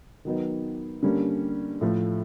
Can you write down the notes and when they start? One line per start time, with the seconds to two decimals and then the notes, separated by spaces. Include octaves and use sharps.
0.25 D#3 F#3 B3 D#4
1.03 D3 G3 A#3 C#4
1.81 A2 F3 A3